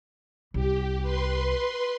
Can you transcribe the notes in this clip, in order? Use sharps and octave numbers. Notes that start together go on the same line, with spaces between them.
C2 G4
B4 C6